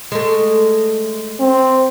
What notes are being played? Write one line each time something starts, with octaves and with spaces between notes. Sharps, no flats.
G#3 A3
C4